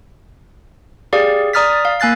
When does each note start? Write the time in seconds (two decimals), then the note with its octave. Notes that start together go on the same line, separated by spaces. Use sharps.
1.13 G4 G#4 D5 F5
1.53 D5 A#5 D#6 F6 A6 B6
1.85 F5
2.00 A#3 G#5 F#6 A6 C7